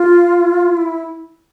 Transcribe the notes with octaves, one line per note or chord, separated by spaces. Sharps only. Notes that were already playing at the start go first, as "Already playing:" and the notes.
Already playing: F4
E4